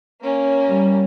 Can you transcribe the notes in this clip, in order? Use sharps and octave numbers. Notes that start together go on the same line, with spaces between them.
A#3 C#4
G3